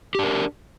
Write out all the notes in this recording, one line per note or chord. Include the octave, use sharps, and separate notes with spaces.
D4 G4 A#4